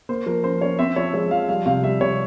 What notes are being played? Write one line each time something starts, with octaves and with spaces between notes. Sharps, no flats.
A#3 C5
F3 A#4
C#4 C5
C#4 C#5
C4 E5
F3 C#5
G#3 C#5
F3 F5
G3 F5
C3 F5
G3 E5
C3 C#5